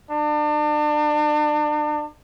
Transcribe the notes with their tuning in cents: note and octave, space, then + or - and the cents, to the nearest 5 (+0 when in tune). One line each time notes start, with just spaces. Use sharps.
D4 +35